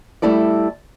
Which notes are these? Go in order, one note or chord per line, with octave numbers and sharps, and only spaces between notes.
G3 A3 E4 A4 D5